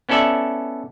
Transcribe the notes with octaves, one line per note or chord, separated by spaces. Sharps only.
B3 C#4 E4 A4 D5 E5